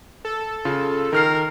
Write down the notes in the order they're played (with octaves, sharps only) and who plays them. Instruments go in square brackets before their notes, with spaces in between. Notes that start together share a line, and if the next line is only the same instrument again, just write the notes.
[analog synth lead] A4
[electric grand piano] C#3 F4
[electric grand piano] D#3 F6 C7 [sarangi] A#4